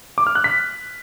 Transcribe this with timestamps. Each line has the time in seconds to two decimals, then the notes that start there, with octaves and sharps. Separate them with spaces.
0.18 D6
0.27 F6
0.35 F#6
0.44 B6